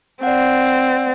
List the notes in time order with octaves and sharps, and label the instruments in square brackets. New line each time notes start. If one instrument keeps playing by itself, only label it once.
[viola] C4 [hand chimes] D5 F#5